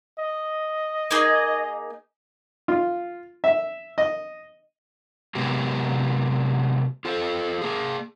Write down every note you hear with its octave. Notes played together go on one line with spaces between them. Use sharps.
D#5
A#3 D#4 G#4
F4
E5
D#5
C3 F#3 G#3 B3 G4
F4 A4 C5
A#3 G#4